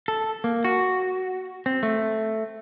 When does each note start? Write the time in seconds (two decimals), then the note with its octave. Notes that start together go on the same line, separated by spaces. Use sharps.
0.08 A4
0.44 A#3
0.65 F#4
1.66 C4
1.83 A3